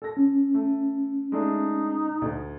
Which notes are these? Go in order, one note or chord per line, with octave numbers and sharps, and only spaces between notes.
A4 A#6
C#4
A3
G#3 A3 D4 D#4
D2